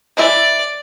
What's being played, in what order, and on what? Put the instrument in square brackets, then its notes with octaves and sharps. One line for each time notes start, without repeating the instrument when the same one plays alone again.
[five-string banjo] E3 E4 E5 [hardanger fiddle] D5